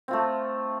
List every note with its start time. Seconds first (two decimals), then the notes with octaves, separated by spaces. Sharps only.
0.08 C4
0.11 F4
0.13 A3